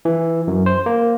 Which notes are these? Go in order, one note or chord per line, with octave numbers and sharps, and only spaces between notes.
E3
F#2
C5
A#3